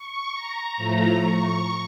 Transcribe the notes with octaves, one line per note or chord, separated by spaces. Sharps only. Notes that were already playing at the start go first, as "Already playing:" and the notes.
Already playing: C#6
A#5
A2 F3 A3 A#5
C#6